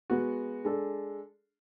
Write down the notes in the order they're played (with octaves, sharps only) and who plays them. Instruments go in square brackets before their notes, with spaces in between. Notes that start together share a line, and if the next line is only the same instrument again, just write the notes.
[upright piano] G#3 B3 F#4
G#3 D4 A4